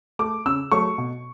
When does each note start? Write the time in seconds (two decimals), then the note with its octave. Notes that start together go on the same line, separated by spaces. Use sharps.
0.19 A3 D6
0.46 C#3 E6
0.72 F#3 A3 C#6
0.98 B2